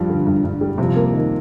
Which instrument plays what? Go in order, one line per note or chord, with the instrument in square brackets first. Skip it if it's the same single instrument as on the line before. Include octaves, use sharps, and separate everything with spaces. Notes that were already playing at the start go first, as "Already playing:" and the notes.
Already playing: [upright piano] G2 G3 [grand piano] F3
[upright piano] D3
G2
G2
G3
[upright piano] C3 [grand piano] F3
[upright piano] A#3
D#3